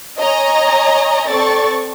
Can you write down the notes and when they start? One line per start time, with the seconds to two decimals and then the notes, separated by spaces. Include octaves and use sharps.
0.20 C#5 D#5 G#5 A#5
1.29 C4 A4 D5 C#6 A6